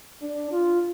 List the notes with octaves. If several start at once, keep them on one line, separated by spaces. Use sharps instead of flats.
D4
F4